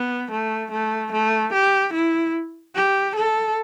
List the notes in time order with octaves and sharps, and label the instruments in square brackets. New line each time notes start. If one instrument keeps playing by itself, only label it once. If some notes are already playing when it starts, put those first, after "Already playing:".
Already playing: [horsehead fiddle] B3
A3
A3
A3
G4
E4
G4
A4